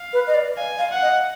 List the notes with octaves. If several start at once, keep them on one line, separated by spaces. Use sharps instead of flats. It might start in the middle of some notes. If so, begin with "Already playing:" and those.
Already playing: F5
B4
D#5
D5
F5 G#5
F5
F#5
D#5